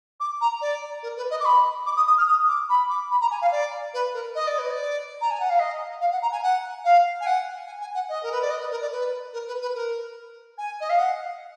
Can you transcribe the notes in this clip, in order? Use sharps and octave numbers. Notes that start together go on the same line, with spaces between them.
D6
A#5
D5
A#4
B4
D#5
D6
B5
D6
D#6
D#6
F6
D#6
D6
B5
D6
B5
A#5
G#5
F5
D5
B4
A#4
D#5
D5
B4
D5
A#5
G#5
F#5
F5
D#5
F5
F#5
A#5
G#5
F#5
F5
G#5
F#5
G#5
G#5
F#5
D#5
A#4
B4
D5
D#5
B4
A#4
D5
B4
A#4
B4
B4
A#4
G#5
D#5
F5
F#5